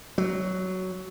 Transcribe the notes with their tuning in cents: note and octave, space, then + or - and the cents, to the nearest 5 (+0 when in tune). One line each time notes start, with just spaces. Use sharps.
F#3 +10